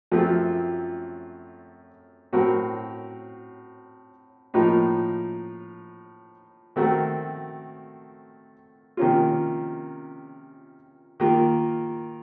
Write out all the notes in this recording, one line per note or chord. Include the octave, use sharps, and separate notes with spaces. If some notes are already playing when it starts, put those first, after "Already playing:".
F#2 F3 A3 C4 F4
A2 F#3 C4 F#4 A#4
A2 F3 A#3 D#4
D#3 A3 C4 F#4 A#4
C3 D#3 A#3 C#4 F4
D#3 A#3 F4